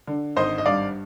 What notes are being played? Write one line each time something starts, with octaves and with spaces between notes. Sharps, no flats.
D3
G#1 C5 D#5
D#5
G2 D5 F5